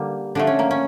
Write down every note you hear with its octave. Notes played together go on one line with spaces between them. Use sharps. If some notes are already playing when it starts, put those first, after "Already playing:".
Already playing: D3 G3 A#3
D3 F3 A3 D4
C#4
A#3
C#4